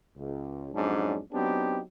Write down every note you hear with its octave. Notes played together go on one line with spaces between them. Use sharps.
C#2
F2 G#2 F#3 C#4 D4
F#3 B3 C4 D4 D#4 G4